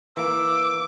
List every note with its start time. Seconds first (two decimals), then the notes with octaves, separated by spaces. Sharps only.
0.17 E3 A#3 D6 E6